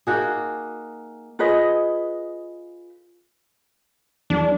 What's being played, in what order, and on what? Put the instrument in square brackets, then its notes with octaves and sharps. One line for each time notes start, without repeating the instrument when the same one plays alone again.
[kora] A#3 D#4 F#4 G#4
[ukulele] F4 G#4 B4 D#5
[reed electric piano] E2 F#3 [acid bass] D4